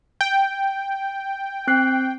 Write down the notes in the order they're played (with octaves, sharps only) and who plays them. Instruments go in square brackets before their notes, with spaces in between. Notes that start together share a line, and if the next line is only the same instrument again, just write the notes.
[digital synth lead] G5
[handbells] C4 F#6 C7